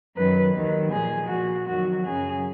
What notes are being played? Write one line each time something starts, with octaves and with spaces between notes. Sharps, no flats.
F#2 D#3 F#3 B4
D#2 D#3 F#3
A#2 F3 G#4
A#2 F3 F#4
F2 D#3 F#3 F#4
F#2 C#3 F#3 G#4